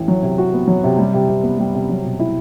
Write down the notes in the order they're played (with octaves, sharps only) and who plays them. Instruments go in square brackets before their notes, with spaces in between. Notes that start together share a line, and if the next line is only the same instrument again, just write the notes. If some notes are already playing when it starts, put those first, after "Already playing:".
Already playing: [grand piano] A1
F#3
C3
F#4
B3
F#3
C3
G3
C3
C3
B3
G3
C3
F#3
B2
E4